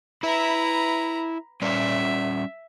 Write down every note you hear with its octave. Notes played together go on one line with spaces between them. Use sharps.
E4 B4 E5 A#5
G3 C#4 D5 E5